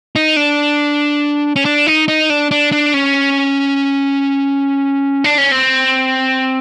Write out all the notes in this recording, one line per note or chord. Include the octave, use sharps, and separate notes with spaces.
D#4
D4
C#4
D4
D#4
D#4
D4
D4
D4
C#4
D4
C#4
C4